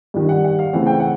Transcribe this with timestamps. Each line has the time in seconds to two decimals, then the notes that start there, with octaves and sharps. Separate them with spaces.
0.14 G2 D#3 G3
0.29 F#5
0.44 F#5
0.59 F5
0.73 C#3 E3 A3 C4 F#5
0.87 G5
1.00 F#5